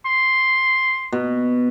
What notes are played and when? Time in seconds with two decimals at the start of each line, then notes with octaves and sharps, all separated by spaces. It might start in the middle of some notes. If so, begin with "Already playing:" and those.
0.05 C6
1.12 B2